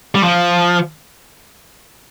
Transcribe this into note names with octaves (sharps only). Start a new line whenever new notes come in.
G3
F3